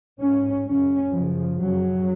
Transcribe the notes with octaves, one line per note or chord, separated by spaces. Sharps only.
G#2 C#4
F#2 C#3 C#4
F#2 C#3 F3
F#2 C#3 F#3